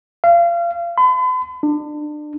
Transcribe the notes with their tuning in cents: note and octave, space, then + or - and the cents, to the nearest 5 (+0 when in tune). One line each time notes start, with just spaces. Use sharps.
F5 -30
B5 +45
D4 +30